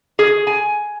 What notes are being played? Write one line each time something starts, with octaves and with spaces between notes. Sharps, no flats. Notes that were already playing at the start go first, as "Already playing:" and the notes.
G#4
G#5